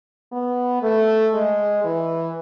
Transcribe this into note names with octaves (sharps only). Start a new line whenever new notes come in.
B3
A3
G#3
E3